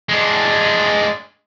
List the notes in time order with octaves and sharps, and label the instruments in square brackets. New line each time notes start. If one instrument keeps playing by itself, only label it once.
[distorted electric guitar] G#3 D4